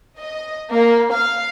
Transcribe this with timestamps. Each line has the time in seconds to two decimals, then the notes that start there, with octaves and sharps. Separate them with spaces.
0.19 D#5
0.72 A#3
1.12 F5